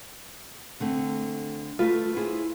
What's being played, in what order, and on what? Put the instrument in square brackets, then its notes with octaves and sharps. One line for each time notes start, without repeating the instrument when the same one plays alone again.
[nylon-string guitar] D3 A3 C4
[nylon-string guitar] A3 B4 [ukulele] F4
[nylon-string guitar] E4 G#4 C5